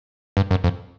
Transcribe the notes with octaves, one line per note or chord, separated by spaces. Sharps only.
G2
F#2
F2